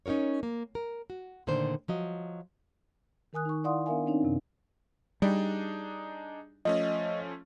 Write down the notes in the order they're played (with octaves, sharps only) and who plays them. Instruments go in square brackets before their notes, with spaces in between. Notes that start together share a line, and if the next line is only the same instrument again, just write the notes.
[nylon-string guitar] C#4 D#4 F4 A#4 C#5
A#3
A#4
F#4
A#2 D3 D#3 A3 D4 C5
F3 F#3 D#5
[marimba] D#3 A#4 G#5 D#6 F#6
D#4 C#6
E4 D5 F5 F#5 C6 D#6
B3 D4 A#4 E5 F5 G#5
C4 D4 D#4 C#5
F#2 C3
[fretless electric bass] G3 [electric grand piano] D4 D#4 G#4
[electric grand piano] F3 A3 C#4 [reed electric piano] D#5